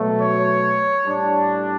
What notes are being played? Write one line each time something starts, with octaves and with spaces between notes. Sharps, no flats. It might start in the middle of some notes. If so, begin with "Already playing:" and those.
Already playing: B2 F#3 A3
C#5
A2 G3 D4